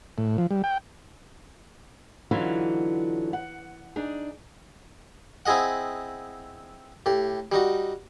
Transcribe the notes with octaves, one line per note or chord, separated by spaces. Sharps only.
A2
F3
G3
G5
D3 E3 F#3 C#4 D#4 F4
F#5
D4 D#4 G#4
C4 E4 G#4 D#5 F#5
A2 G4
G3 D#4 F#4